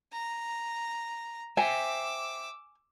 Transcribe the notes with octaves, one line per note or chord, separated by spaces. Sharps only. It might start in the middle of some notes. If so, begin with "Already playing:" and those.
A#5
C5 E5 G5 G#5 D6 E6